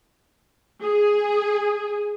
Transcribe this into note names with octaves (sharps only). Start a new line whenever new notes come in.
G#4